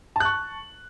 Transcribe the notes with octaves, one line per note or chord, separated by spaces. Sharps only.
A5 C#6 F#6